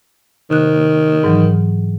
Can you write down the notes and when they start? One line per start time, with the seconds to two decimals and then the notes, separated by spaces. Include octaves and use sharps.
0.50 C3 D#3 F#6
1.24 G#2 E3 F#3